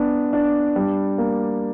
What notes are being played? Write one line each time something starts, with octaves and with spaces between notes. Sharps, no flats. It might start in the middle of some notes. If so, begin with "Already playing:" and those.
Already playing: B3 D4
D4
G3
A#3